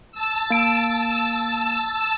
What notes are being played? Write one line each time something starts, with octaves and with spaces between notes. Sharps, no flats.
A5 E6
A#3 D7